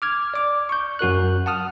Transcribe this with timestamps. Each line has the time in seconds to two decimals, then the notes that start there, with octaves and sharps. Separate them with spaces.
0.02 D6 F6 G#6
0.34 D5 D6
0.69 C#6 G6
0.99 F#2 F#4 A#4 F#6
1.46 F#5 A5 D#6 F6